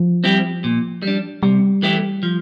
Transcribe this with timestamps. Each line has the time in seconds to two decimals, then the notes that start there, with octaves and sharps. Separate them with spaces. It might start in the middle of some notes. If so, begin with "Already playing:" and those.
Already playing: F3
0.24 G3 C4 E4 G4
0.64 A#2
1.02 G3 D4
1.43 C3 G3
1.82 E3 A3 E4 G4
2.23 F3